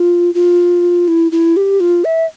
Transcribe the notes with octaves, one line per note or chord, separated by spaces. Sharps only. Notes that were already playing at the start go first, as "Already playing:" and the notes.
Already playing: F4
F4
E4
E4
G4
F4
E5